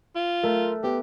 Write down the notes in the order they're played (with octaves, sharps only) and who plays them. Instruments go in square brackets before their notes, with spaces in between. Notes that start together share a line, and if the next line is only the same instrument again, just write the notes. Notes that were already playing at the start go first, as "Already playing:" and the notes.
[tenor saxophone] F4
[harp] A3 [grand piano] A#4
[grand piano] B3 [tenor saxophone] G4